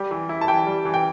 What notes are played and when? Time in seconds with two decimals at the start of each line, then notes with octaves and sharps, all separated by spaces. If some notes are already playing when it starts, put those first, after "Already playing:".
Already playing: G3 G4
0.11 E3
0.29 E4
0.41 A5
0.48 E3 G5
0.67 G3
0.85 E3
0.94 G5